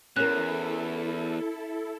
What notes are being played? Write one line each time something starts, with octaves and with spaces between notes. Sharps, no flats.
E2 C#4 E4 A4 A#4 F#6